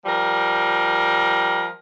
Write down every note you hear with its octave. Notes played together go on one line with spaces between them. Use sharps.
F3 G3 A#4